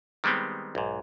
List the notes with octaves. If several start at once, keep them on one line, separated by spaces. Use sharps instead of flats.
D#3 G3 G#3 B3 C4
B1 G#2